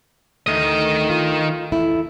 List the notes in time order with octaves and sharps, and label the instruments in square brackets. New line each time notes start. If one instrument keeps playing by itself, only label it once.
[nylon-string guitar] D2 A3 [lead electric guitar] D#3 D#5
[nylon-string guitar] F4
E2 A3 E4